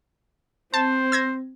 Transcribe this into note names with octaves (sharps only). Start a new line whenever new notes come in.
C4 C5 A5
E6 G#6 A#6